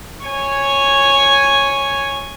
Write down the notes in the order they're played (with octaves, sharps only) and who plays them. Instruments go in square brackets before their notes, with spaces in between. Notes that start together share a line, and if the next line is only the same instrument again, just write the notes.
[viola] C#5 G#5